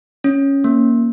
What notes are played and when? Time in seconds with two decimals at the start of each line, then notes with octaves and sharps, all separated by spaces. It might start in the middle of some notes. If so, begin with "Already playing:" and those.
0.24 C#4
0.64 A#3